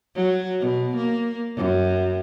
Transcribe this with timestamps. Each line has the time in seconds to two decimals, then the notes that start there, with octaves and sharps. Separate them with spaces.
0.15 F#3
0.60 B2
0.95 A#3
1.56 F#2